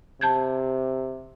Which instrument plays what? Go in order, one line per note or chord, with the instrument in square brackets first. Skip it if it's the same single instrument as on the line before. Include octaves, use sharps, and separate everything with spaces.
[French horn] C3 [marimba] A5 G6 G#6